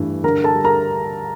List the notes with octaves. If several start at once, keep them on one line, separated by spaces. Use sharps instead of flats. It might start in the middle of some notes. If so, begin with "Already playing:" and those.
Already playing: G2 E3 A3
D3 A#4 A#5
A4 A5
G3
A#4 A#5